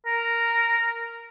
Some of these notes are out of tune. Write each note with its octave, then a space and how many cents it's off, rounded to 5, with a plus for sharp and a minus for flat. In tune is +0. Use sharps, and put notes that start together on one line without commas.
A#4 -5